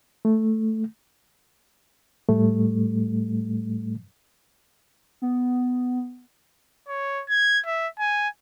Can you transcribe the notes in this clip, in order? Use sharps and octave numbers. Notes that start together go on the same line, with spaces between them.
A3
A2 G3 A3
B3
C#5
G#6
E5
G#5